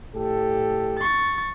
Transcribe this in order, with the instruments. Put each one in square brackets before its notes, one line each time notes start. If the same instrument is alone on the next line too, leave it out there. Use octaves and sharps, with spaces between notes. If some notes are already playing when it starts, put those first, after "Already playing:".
[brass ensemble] A2 G4 A4
[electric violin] C#6 A6